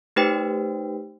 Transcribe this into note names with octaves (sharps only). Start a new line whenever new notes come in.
A3 D#4 G4 B4 C5 G5